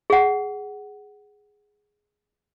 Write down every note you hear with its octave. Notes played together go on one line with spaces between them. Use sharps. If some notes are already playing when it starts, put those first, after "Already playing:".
G#4 F#5